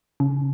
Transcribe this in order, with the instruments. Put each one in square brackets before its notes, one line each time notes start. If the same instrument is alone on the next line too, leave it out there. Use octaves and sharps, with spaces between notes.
[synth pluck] C#3